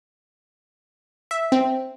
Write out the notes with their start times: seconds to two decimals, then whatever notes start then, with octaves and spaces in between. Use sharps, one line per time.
1.31 E5
1.52 C4